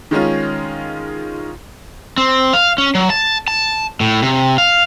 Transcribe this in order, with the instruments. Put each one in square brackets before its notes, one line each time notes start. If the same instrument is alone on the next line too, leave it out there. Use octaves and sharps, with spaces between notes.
[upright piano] D#3 G#3 C#4 F4
[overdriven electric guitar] C4
F5
C#4
F#3
A5
A5
A2
C3
F5